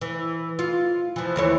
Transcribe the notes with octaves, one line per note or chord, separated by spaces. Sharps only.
E3
F4
E3 F3
D#2 E3 C#5